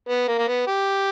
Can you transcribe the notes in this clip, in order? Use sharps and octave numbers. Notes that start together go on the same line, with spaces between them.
B3
A#3
A#3
B3
G4